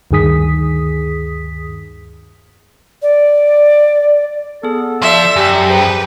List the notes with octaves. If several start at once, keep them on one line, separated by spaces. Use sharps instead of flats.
D2 G2 D#3 G#4 D#6 B6
D5
B3 G#4 A4
F3 D5 E5 C6
F#2 G4
G#4 B4 C5 G5